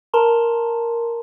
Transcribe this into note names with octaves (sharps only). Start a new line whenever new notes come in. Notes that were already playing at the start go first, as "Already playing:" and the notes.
A#4 A5 A#5 C6